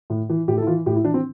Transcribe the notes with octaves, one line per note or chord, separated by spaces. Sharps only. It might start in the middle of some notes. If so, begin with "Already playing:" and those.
A2
E3
A2 G4
A4
E4
E3 F4
A2 G4
E4
E3 D4
C4